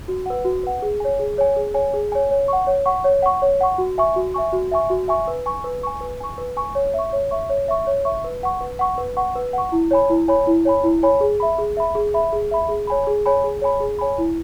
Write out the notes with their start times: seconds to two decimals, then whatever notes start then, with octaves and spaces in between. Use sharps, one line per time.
0.08 F#4
0.26 B4 F#5
0.45 F#4
0.63 B4 F#5
0.82 G#4
1.00 C#5 G#5
1.19 G#4
1.38 C#5 G#5
1.56 G#4
1.74 C#5 G#5
1.94 G#4
2.12 C#5 G#5
2.31 C#5
2.48 F#5 C#6
2.67 C#5
2.86 F#5 C#6
3.04 C#5
3.22 F#5 C#6
3.42 C#5
3.61 F#5 C#6
3.78 F#4
3.98 E5 G#5 C#6
4.16 F#4
4.34 E5 G#5 C#6
4.53 F#4
4.71 E5 G#5 C#6
4.90 F#4
5.08 E5 G#5 C#6
5.28 B4
5.46 G#5 C#6
5.64 B4
5.83 G#5 C#6
6.01 B4
6.21 G#5 C#6
6.38 B4
6.57 G#5 C#6
6.75 C#5
6.94 E5 C#6
7.13 C#5
7.31 E5 C#6
7.49 C#5
7.68 E5 C#6
7.87 C#5
8.05 E5 C#6
8.24 B4
8.43 F#5 C#6
8.61 B4
8.79 F#5 C#6
8.98 B4
9.17 F#5 C#6
9.35 B4
9.53 F#5 C#6
9.72 E4
9.91 C#5 G#5 B5
10.10 E4
10.28 C#5 G#5 B5
10.47 E4
10.65 C#5 G#5 B5
10.84 E4
11.03 C#5 G#5 B5
11.21 G#4
11.40 E5 B5
11.58 G#4
11.77 E5 B5
11.95 G#4
12.14 E5 B5
12.33 G#4
12.51 E5 B5
12.69 G#4
12.87 C#5 G#5 B5
13.07 G#4
13.26 C#5 G#5 B5
13.44 G#4
13.61 C#5 G#5 B5
13.80 G#4
13.99 C#5 G#5 B5
14.18 E4